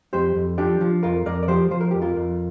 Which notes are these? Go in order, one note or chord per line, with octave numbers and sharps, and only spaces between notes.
F2 G4 C5
F2
F3 D4 G4
F3
F2 F4 A#4
F2 A#4 D5
D5
F3 G4 C5
F3 C5
A#4
F2 G4
F4 A#4
F2